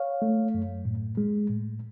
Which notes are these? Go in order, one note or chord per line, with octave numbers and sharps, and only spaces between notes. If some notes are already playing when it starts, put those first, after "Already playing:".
Already playing: C#5 F5
A3
F#2
A2
G#3
A2